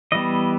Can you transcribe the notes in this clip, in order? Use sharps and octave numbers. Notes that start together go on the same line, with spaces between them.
E3 G3 B3 D#5